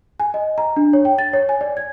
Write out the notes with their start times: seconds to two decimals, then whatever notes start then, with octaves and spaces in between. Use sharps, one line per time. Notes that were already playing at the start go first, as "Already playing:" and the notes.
0.20 G#5
0.34 D#5
0.58 A#5
0.76 D4
0.93 C#5
1.05 G5
1.18 A6
1.33 C#5
1.49 G#5
1.61 D5
1.77 G#6